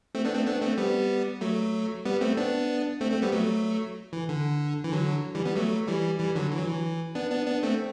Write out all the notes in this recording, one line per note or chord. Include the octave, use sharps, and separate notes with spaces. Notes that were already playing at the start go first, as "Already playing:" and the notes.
A3 C4
B3 D4
A3 C4
B3 D4
A3 C4
G3 B3
F#3 A3
G3 B3
A3 C4
B3 D4
A3 C4
A3 C4
G3 B3
F#3 A3
E3
D3
E3
D3 F#3
E3 G3
G3 B3
F#3 A3
E3 G3
E3 G3
D3 F#3
E3
F#3
E3
B3 D4
B3 D4
B3 D4
A3 C4